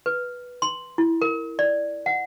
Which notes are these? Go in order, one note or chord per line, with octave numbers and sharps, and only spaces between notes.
B4
C6
E4
A#4
D5
F#5